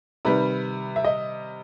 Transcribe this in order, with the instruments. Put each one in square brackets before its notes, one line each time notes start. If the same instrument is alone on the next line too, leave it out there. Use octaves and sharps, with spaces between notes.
[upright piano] C3 D#3 G3 [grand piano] B4
[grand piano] E5
D#5